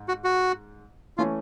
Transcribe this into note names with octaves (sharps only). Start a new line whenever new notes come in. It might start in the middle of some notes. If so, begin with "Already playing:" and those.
Already playing: G#2
F#4
F#4
E3 A3 C#4 F4